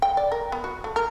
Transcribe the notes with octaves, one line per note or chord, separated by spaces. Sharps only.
G5
D5
A#4
B3
F#4
A3
A#4